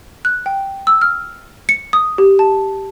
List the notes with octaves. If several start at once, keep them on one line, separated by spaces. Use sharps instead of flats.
F#6
G5
E6
F6
C#7
D#6
G4
A5